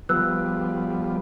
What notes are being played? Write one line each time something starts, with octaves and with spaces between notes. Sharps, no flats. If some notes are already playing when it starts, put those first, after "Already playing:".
F3 G3 B3 B4 E6 F#6